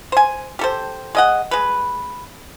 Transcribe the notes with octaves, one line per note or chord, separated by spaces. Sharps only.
C5 G#5
G4 A4 C5
G#3 D#5 F#5
G#3 B4